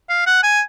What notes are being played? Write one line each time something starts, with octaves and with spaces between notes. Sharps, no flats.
F5
F#5
G#5